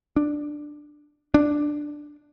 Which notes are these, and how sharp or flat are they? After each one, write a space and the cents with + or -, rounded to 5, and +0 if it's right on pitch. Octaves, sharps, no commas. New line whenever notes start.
D4 +10
D4 +5